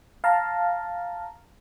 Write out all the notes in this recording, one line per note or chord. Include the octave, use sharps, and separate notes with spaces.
F5 A5 A#5